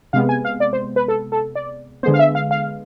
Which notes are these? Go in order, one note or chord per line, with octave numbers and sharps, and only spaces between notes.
C3 G#3 B3 F5
G#5
F5
D5
C5
B4
A4
A4
D5
D3 G#3 B3 C5
F5
E5
F5
F5